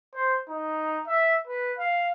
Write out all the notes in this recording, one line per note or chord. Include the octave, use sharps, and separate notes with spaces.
C5
D#4
E5
B4
F5